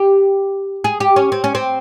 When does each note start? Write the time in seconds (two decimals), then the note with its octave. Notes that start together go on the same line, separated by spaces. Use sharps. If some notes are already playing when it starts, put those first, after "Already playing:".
Already playing: G4
0.84 G#4
1.00 G4
1.16 C#4
1.32 C4
1.44 C#4
1.55 C4